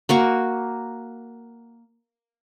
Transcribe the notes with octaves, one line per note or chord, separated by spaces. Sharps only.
A#3 F#4 C#6